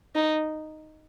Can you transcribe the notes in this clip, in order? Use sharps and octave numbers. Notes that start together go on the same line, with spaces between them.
D#4